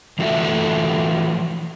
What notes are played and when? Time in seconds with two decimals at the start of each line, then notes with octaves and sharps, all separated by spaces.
0.19 E3 F3 A3 F#4 A4 E5